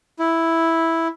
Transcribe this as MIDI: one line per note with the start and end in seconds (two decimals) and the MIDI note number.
0.19 1.08 64